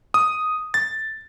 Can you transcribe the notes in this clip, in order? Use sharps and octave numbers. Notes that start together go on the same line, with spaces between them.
D#6
A6